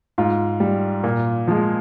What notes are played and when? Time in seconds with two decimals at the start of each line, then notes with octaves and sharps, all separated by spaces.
0.18 G#2 F4
0.60 G3
1.04 A#2
1.48 F3 G#3